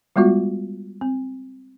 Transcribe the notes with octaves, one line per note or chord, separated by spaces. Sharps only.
G3 G#3 B3 F4 F#4
C4